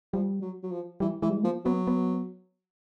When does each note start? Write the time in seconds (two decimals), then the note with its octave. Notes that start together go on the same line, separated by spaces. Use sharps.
0.13 F3 G3
0.42 F#3
0.63 F#3
0.72 F3
1.00 E3 G3
1.22 E3 G#3
1.29 G3
1.36 G#3
1.43 F3 A#3
1.65 F#3 B3
1.87 B3